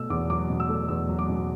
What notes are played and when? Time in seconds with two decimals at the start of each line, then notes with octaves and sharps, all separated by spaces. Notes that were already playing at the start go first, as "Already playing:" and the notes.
Already playing: B2 A3 E6
0.10 E2 D6
0.30 F#3 D6
0.49 B2
0.60 E6
0.69 A3
0.88 E2 E6
1.09 F#3
1.19 D6
1.28 B2